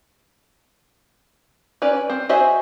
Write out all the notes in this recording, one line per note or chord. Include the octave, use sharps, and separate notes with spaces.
C#4 B4 D5
C4
F#4 G#4 C5 D#5 E5